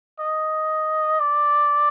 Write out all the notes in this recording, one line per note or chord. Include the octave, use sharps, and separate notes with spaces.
D#5
D5